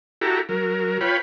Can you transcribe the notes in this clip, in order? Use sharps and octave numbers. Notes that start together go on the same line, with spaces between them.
E4 F#4 G4 A4 A#5
F#3 A#4
F4 B4 C#5 G5 B5